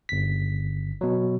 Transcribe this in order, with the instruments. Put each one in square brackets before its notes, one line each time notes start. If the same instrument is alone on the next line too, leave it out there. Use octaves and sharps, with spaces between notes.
[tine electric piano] G1 B6
B2 F#3